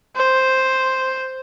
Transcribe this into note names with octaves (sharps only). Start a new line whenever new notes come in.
C5